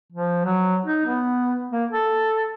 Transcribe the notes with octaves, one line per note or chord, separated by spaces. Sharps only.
F3
F#3
D#4
B3
A#3
A4